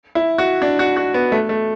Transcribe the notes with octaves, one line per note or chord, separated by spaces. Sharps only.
E4
F#4
D4
F#4
F#4
B3
A3
A3